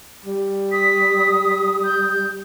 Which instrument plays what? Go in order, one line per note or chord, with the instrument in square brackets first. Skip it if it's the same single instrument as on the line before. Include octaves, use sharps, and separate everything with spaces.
[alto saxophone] G3
[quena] D#6 [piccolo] B6
[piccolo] G6